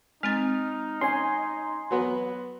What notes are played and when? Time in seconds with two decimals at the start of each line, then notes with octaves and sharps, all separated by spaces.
0.23 G#3 C4 D#4 F6 A6
1.01 C#4 G#5 C6
1.91 F#3 B3 B4